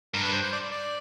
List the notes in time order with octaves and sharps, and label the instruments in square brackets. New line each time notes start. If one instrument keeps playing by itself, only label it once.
[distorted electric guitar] G2 [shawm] A#4
[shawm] B4
C5
C5
D5
D5